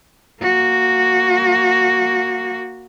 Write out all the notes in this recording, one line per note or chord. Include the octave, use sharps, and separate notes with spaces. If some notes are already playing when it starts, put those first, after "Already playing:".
A#3 F#4